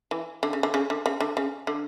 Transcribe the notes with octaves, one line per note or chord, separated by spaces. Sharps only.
E3
D3
C#3
D3
C#3
D3
C#3
D3
C#3
D3